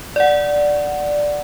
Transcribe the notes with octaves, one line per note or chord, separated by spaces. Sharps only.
D5 F#5